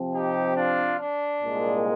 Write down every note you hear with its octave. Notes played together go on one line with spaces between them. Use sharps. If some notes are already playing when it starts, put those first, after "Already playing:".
Already playing: C3 F3 C4
D#4 G4
D4 F4
D4
C2 A#2 G#3